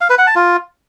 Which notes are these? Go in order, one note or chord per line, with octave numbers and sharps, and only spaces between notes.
F5
B4
F#5
A5
F4